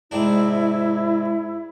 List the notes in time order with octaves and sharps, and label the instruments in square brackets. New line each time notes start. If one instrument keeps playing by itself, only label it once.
[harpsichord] G#2 C3 D4 [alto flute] E4